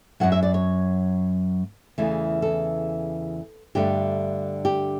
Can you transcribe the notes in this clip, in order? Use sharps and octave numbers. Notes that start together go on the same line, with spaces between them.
F#2 C#3 F#3 F#5
E5
D5
C#5
E2 C#3 E3 A3
A4
G2 D3 A3 G4
G4